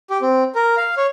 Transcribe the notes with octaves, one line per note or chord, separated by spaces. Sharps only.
G4
C4
A#4
F5
C#5